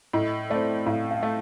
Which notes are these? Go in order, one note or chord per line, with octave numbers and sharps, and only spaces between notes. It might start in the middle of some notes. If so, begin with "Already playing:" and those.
A2 D#5
A3 C4 D5
A2 F5
F5
A3